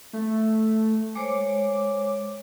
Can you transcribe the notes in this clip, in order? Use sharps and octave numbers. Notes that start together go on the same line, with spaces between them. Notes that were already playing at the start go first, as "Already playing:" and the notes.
A3
G#3 C5 C#5 D6